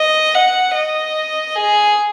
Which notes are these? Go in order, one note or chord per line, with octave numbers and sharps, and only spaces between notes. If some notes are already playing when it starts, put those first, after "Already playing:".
Already playing: D#5
F#5
D#5
G#4